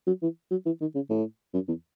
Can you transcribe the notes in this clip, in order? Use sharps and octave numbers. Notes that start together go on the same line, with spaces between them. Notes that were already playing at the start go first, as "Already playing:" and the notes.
F#3
E3
F#3
E3
D#3
C#3
A2
F#2
E2